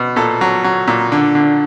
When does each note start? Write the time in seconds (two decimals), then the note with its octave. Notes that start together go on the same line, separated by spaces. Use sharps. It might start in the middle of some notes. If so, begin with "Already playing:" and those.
Already playing: B2
0.16 A#2 A4
0.41 F#3
0.64 F#3
0.88 A#2
1.12 D3
1.35 D3